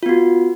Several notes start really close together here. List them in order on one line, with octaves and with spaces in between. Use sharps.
F4 B3 F#4